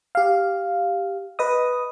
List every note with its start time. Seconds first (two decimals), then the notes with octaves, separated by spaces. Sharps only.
0.15 G4 F5
1.39 B4 D#5 D#6